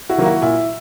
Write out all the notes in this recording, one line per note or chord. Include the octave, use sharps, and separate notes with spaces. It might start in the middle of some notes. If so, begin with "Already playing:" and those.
E4 F#4
D#3 F#3 A#3
E4 F#4
A#2 E4